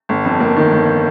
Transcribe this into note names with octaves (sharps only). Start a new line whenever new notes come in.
G1
F2
A#3
D#3
G1